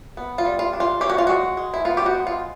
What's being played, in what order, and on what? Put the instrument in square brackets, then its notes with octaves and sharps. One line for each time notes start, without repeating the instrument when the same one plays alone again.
[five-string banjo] B3
F4
G3
F4
D4
F4
C#4 G4
F#4
F4
G#3 F#4
G#3
E4
B3 F4
G4
F#4
G#3
F4